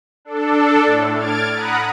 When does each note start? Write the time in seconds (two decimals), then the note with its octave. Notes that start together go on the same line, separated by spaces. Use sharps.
0.25 D4 A4
0.85 A2
1.15 F6 G#6 A6 D7
1.54 F#5 A#5 B5 D#6 F#6